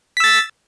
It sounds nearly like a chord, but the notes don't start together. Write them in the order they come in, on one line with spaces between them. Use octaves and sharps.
B6 E6 A6